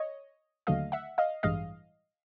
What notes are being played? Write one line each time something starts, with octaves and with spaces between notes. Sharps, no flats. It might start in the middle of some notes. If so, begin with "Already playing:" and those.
Already playing: C#5 D#5
D#2 D3 F#3 A3 D#5 F5
E5 F#5
D#5 F5
A1 G2 E3 G#3 D#5 F5